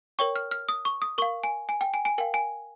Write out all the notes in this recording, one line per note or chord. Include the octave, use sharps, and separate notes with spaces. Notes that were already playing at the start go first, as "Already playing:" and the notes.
A#4 C#5 G5 C#6
F6
F6
D#6
C#6
D#6
A#4 F5 C#6
G#5
G#5
G5
G#5
G#5
A#4 F5 G5
G#5